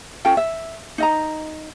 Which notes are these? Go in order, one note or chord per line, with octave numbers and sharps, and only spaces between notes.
C#4 F4 A4 G5
E5
D#4 D#5 A#5